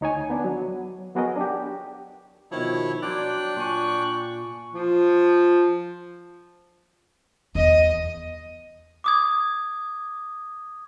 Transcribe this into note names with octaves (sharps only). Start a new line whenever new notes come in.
D2 D#4 C#5 G#5
B3 D4
F#3
F#3 B3 F#4 G#4 A#4 D#5
D4 G4
B2 D#3 F3 E4 C#5
F#3 D4 D5 G5 C6 F#6
A#2 G#5 C#6
F3
E2 D#5
D6 D#6 G#6